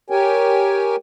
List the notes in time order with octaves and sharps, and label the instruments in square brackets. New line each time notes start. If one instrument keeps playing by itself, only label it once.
[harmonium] G4 A#4 C#5 G5 G#5